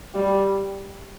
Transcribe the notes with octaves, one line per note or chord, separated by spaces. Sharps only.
G3